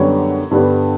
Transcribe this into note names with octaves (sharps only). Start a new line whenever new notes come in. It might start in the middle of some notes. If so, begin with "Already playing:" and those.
Already playing: F#2 D3 G3 B3 C#5
G2 D3 G3 B3